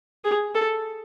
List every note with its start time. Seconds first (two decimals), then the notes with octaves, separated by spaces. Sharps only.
0.24 G#4
0.55 A4